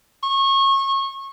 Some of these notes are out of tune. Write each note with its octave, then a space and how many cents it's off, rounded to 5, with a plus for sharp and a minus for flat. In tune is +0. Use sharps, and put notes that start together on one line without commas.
C#6 -30